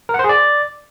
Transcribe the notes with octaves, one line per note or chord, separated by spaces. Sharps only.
A#4
F#5
C5
G#4
D5